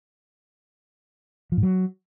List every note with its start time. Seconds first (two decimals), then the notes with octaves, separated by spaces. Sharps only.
1.52 F3
1.57 G#2
1.63 F#3